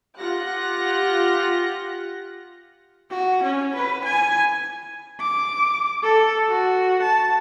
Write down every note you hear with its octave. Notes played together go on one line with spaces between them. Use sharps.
F4 G4 F#5 F#6 A#6
F#4
C#4
B4
G#5
D6
A4
F#4
A5